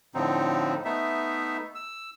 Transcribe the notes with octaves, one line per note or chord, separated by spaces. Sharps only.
A2 D3 F3 C4 D#4
A3 B3 D#4 E5
E6